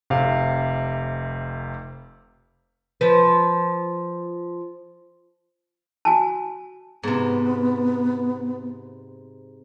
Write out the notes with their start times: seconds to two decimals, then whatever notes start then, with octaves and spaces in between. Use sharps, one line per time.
0.10 F1 C3 F5
3.01 F3 B4
6.05 F#4 G#5 A5
7.03 G#2 C3 B3